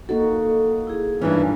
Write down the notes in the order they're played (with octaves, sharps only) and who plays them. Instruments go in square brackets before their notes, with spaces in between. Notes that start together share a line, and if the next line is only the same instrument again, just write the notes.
[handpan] A#3 D#4 F#4 [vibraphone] A4
[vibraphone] E4 G#4
[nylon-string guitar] G2 D#3 C#4 [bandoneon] E3 [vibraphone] F4